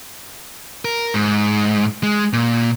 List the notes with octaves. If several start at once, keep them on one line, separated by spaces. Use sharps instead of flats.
A#4
G#2
G#3
A#2